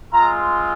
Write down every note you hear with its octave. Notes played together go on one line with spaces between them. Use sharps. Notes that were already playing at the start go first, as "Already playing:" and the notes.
G#3 C4 F4 A#5